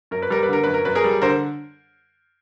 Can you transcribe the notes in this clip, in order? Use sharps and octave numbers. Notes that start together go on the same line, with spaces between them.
F#2 A#4
B4
G3 A#4
B4
D3 A#4
F#2 B4
A#4
F#2 B4
G#4 A#4
G3
D3 A#4 C5